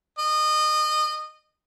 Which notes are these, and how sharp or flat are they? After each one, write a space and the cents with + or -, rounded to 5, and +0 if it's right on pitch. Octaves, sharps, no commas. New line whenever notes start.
D#5 -25